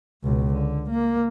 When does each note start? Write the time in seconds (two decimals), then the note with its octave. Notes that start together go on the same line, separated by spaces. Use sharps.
0.23 C#2 B2
0.53 D3
0.90 A#3